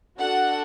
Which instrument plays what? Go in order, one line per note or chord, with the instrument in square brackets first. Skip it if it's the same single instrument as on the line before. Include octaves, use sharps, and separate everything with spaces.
[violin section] D4 F#4 A4 F#5